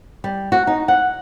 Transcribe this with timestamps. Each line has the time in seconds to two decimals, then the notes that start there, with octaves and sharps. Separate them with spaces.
0.24 G3
0.52 F#4
0.67 D#4
0.88 F#5